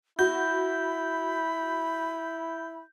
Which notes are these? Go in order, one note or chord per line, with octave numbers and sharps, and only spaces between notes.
E4 F#4 B5 G6